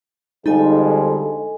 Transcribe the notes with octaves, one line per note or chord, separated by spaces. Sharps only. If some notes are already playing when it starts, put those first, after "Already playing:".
F2 D3 G3 G#3 D#4 A4 D#5 G#5